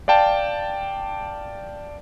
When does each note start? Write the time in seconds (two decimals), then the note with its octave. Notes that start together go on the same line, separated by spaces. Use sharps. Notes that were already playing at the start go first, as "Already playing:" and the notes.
0.08 D5 F5 G5 A5